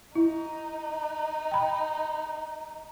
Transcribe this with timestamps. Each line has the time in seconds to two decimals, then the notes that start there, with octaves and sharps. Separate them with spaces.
0.15 D#4 E4
1.51 G5 B5